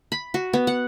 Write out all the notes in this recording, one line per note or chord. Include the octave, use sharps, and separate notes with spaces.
B5
F#4
B3
F#5